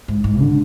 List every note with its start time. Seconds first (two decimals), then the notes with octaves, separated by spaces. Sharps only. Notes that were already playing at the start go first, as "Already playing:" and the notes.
0.08 G#2
0.24 G#2
0.39 D3